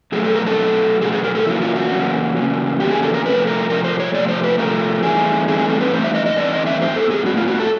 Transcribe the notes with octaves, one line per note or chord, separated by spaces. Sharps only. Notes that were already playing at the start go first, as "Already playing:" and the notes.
B2 F#3 A3 G#4
A4
A#4
A4
B2 F#3 A3
B2 F#3 A3 G#4
G#4
A#4
A4
E2 C#3 F#3 A#3 E4
F4
F#4
E2 C#3 F#3 A#3
E2 C#3 F#3 A#3
E2 C#3 F#3 A#3 G4
G#4
A4
A#4
C3 F3 A3 B4
A#4
C3 F3 A3 A#4
C5
C#5
C3 F3 A3 D5
C5
B4
C3 F3 A3 A#4
G2 E3 A3 C4 D#4 G#4
G2 E3 A3 C4 D#4 G#4
G#4
A4
B4
G2 E3 A3 D#4 C5
E5
D#5
D#5
G2 E3 A3 C4 D#4 D5
D#5
E5
A2 F#3 B3 C5
A4
G#4
A2 F#3 B3 F#4
F4
F#4
A4